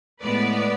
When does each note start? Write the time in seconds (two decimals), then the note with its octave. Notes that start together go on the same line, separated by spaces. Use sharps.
0.22 A2 G#3 B3 B4 D5